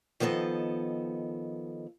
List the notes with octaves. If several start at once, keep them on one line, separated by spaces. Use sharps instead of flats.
D#3 F3 B3 A4 D#5